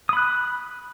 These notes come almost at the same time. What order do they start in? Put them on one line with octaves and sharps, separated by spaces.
D#6 B5 F#6